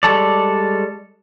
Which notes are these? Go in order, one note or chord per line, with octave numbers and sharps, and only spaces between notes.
G3 G#3 A4 C#5 D5